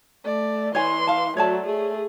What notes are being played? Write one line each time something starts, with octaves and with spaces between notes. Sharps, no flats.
A3 D5
E3 C#5 G5 G#5 C6
F5 A5
F#3 A3 C#5 D5 A5
A3 G#4